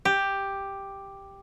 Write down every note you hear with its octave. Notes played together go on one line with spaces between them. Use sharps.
G4